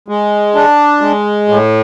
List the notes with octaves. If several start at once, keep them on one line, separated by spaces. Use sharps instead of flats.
G#3
D4
G#3
A2